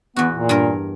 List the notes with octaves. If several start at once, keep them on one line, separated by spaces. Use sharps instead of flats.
E2 B3 F#4
A#2
G2 A#4